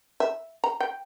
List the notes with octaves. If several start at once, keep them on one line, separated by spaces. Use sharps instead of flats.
E5
A#5
G5